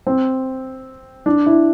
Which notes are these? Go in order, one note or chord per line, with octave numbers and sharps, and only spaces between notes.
C4
D4
E4